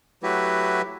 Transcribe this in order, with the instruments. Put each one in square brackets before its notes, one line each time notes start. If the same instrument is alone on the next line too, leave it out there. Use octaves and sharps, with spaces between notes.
[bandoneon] F#3 A3 E4 F#4 G4 B4